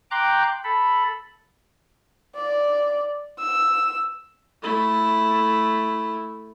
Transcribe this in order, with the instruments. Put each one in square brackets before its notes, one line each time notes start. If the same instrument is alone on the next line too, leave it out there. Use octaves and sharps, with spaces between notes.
[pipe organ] G5 A#5 C6 D6 F#6 G6
A4 B5
[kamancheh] D5
E6
[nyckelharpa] A3 E4